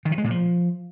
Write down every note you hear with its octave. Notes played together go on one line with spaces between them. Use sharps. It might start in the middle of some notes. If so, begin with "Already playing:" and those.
D#3
E3
G#3
A#2
F3